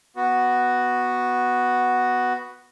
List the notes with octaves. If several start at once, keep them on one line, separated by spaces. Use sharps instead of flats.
B3 F#4